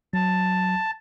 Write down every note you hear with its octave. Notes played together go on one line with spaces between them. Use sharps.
F#3 A5